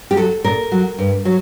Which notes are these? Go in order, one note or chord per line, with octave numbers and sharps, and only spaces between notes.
G4
F#3 A4
A#2 A#4
F#3
G2
F#3